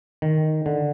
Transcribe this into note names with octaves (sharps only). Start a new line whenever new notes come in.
D#3
D3